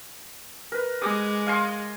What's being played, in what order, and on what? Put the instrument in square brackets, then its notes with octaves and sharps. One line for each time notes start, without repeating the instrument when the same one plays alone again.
[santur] A#4 B4
[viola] G#3 [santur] G#5 D6 D#6
[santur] F5 G#5 C6